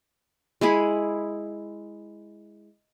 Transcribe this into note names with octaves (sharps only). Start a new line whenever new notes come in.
G#3 E4 G#4 B5